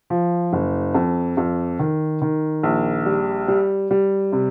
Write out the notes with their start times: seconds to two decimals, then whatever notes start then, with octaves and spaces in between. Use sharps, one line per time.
0.10 F3
0.53 F#1
0.94 F2
1.37 F2
1.79 D#3
2.22 D#3
2.63 A#1
3.06 G3
3.48 G3
3.91 G3
4.32 C3